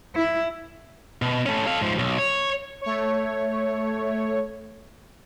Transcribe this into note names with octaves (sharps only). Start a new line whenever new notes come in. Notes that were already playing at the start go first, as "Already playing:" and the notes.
E4
B2
A3 C#4
A4 F5
G#2 F3
B1
C#5
A3 C#5